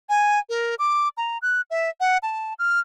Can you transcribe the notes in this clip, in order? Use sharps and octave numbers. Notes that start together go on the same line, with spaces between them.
G#5
A#4
D6
A#5
F#6
E5
F#5
A5
F6